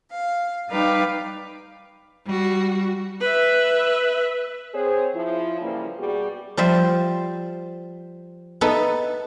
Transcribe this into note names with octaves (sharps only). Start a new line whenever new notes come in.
F5
G3 D#4 B4 F5 G5 D6
G3 F#4
B4 E5
C4 G#4 C5 C#5
F3 E4
C#3 E3 F3 G3 A#3
B2 G3 F#4 G#4
F3 G3 C5 E5
B3 D#4 A4 B4 E5